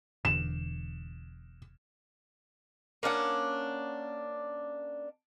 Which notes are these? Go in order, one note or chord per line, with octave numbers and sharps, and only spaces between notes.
E1 E2 D3 E7
A#3 C#4 D4 F#5